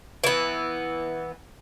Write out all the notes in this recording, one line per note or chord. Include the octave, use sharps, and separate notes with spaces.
E3 B3